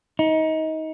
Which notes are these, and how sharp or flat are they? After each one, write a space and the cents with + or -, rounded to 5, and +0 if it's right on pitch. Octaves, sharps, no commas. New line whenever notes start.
D#4 +25